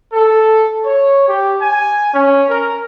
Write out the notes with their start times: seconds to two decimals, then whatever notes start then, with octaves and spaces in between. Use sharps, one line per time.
0.13 A4
0.85 C#5
1.28 G4
1.62 G#5
2.13 C#4
2.49 A#4